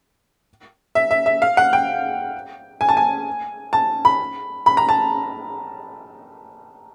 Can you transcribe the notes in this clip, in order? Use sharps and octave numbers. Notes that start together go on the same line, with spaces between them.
E5
E5
E5
F5
F#5
G5
G#5
A5
G#5
A5
B5
B5
A#5
A5